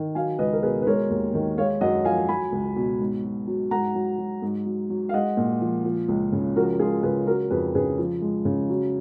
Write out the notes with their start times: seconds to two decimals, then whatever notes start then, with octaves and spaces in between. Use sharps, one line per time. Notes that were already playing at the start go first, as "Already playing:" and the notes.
Already playing: D#3
0.15 F#3 F5 G#5
0.39 C#2 B4 D#5
0.53 A#4
0.62 B2 G#4 B4
0.82 B4
0.87 G#3 A#4 C#5
1.10 D#2
1.34 D#3
1.58 G#3 C#5 F5
1.81 F#2 D#5 F#5
2.05 F3 F5 G#5
2.29 F#3 G#5 B5
2.52 C#2
2.76 B2
3.00 G#2
3.24 F#3
3.47 F#3
3.71 G#2 F#5 A#5
3.95 F#3
4.18 F#3
4.42 G#2
4.66 F#3
4.90 F#3
5.09 F5
5.14 G#3 D#5 F#5
5.37 A#2
5.61 F3
5.85 F3
6.08 C#2
6.32 C#3
6.56 F3 F#4 A#4
6.72 F#4
6.79 G#3 F4 G#4
7.03 C#3 G#4 B4
7.27 F#3 F#4 A#4
7.50 F2 G#4 B4
7.75 C#3 G#4 B4
7.98 F3
8.22 G#3
8.45 C#3
8.70 F#3